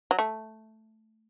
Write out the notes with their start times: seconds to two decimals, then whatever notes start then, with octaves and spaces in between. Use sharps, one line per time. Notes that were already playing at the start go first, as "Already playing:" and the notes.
0.11 F#3
0.19 A3